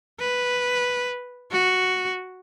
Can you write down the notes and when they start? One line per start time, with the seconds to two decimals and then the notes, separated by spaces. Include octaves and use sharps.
0.20 B4
1.51 F#4